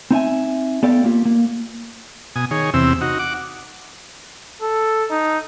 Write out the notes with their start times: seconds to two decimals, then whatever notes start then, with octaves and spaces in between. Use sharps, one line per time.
0.11 C4 D#4 E5 G#5
0.83 B3 G4 A4 D5 F5 G5
1.04 A#3 F4 G4
1.25 A#3
2.36 B2 G#5 D#6
2.51 D#3 G#4 C#5
2.74 E2 C3 C4 E6
3.01 D#4 F#4
3.19 F#5 D6
4.62 A4
5.11 D#4